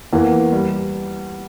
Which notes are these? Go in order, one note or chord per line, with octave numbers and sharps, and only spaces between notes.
E2 E3 A#3
G3